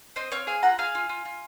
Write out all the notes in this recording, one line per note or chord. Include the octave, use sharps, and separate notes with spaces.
C4 C5 D#5
C4 C#5 F5
G#4 F5 G#5
F4 F#5 A#5
G#4 F5 G#5
F4
F4
F4